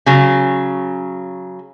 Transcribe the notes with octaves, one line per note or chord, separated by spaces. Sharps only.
C#3 F#3